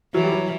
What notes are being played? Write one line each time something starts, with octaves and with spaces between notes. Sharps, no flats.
E3 F#3
G3
F#3